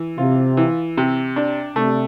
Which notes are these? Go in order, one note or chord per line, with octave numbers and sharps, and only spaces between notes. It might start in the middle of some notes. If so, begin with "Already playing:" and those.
Already playing: E3
C3 F4
E3
C3
D4
C3 A3